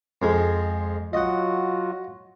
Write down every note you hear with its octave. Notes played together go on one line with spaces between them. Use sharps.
F2 G#3
F#3 F4 F#4 D#5 F#5